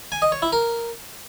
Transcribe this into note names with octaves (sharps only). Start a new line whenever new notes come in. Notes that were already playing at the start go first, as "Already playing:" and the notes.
G#5
D#5
C#5
E4
A#4